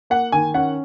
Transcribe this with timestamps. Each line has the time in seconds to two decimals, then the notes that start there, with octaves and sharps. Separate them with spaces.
0.10 A#3 F#5
0.32 D#3 G#5
0.54 C#4 F#5